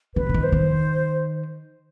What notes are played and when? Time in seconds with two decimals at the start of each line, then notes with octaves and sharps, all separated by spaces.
0.16 D3 B4
0.29 D3
0.34 D#3
0.43 C5
0.52 D#3